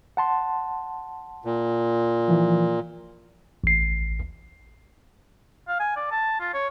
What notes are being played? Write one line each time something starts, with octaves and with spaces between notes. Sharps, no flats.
F#5 A5 C6
A#2
E3 F3
A1 C7
F5
G#5
D5
A5
F4
C#5